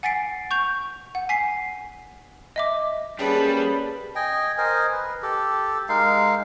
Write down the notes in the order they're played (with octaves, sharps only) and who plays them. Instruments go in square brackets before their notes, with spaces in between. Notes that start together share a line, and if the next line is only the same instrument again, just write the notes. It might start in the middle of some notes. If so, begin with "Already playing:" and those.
[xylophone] F#5 G#5 A6 B6 C7 D7
C#6 G6 F7
F#5
G#5 B6 C7
D#5 E5 D6
[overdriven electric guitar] G3 [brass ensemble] A#3 C#4 A5 [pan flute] G#4 [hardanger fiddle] B4
[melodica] D#5 G5 G#5
A#4 C5 D#5 G#5
B4
G4 A4
G#3 D#4 A#4 F5